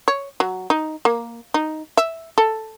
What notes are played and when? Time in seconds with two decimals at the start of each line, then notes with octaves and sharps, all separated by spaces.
0.08 C#5
0.40 F#3
0.70 D#4
1.05 A#3
1.54 D#4
1.97 E5
2.38 A4